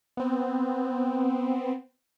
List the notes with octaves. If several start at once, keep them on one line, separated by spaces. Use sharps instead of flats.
B3 C4